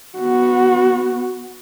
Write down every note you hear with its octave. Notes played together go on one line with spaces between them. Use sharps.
B3 F#4